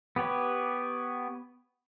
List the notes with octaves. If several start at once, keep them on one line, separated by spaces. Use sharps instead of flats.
B3 G4 B4 C#5